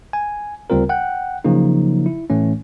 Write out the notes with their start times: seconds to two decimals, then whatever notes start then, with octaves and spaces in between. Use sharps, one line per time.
0.13 G#5
0.70 D2 C#3 G3 C4 F4 A#4
0.89 F#5 G5 F#6
1.44 C#3 F3 F#3 A#3 D#4
2.06 E4
2.30 A2 E3 A3 C#4